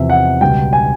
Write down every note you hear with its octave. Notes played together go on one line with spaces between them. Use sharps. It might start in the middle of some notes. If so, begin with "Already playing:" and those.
Already playing: E2 C3 F3 E5
F#5
C#2 B2 G3 G5
G#5